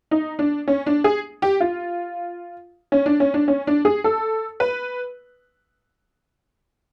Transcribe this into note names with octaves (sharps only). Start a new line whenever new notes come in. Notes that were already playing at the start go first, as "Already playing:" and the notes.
D#4
D4
C#4
D4
G#4
G4
F4
C#4
D4
C#4
D4
C#4
D4
G#4
A4
B4